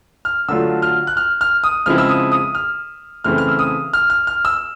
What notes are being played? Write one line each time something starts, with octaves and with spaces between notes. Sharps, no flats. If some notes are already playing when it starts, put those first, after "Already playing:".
F6
D3 F#3 A3 D4 F4 E6
F6
F#6
F6
F6
D#6
C#3 F3 G#3 C4 E4 F6
E6
D#6
D#6
F6
C#3 E3 A3 C4 E4 F6
F6
E6
D#6
F6
F6
F6
E6